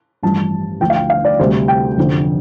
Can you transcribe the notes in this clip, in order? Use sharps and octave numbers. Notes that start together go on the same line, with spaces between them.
A1 G2 F3 A5
D2 D3 F3 G5
F5
G5
F5
D5
D2 C3 G3 C5
G5
F1 F2 D3